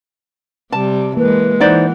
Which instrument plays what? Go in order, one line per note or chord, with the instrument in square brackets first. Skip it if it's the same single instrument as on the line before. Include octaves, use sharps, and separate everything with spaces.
[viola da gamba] C3 G3 [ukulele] A5
[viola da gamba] E3 G#3 [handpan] A#3 [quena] B4
[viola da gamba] E3 [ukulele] D#4 C5 D5 [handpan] F#5